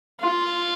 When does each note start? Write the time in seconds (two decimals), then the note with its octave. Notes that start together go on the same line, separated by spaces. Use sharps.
0.21 F4